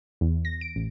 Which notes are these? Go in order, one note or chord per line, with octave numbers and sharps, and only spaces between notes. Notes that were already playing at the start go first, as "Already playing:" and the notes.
E2
A#6
D7
A1